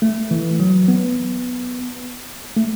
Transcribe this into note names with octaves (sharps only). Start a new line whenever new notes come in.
A3
E3
F#3
B3
A3